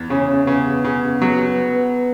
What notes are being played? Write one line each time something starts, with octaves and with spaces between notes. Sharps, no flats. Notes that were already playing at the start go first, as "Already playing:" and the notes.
Already playing: E2
C#3 C#4
C#3 B3
C#3
F#3